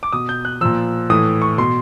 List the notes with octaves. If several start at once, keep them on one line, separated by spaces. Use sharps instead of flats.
D6
B2 D#6
G6
F#6
A#2 F3 E6
A2 E3 D#6
C#6
B2 C6